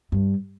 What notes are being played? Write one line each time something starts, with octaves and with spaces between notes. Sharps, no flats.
G2